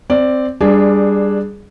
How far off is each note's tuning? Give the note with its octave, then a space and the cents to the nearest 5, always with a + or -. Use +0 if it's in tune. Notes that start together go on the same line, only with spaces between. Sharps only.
C4 -5 D5 +0
G3 +15 D4 +0 G#4 +0